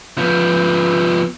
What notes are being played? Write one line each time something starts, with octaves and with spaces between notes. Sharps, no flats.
F3 B3